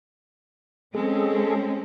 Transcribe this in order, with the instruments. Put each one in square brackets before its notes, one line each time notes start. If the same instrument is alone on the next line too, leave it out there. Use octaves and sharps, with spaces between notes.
[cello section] G#3 C4 C#4 [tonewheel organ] G#4 A4